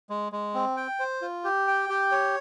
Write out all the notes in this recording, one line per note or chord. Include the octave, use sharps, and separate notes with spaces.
G#3
G#3
C4
G5
C5
F4
G4
G5
G4
C#5